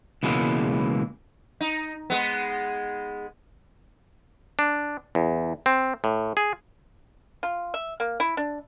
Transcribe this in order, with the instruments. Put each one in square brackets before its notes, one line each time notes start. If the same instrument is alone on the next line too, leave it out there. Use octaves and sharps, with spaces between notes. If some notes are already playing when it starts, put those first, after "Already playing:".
[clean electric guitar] C#2 B2 E3 G#3 A#3
[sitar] D#4
G#3 B3
[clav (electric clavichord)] D4
E2
C4
A2
G#4
[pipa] F4
E5
A#3
E4
D4